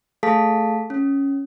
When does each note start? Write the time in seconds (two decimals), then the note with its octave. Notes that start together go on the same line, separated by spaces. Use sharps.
0.23 A3 G#4 A4 F5 A5 B6
0.90 C#4